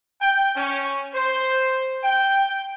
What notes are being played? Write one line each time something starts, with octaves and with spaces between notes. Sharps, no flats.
G5
C#4
C5
G5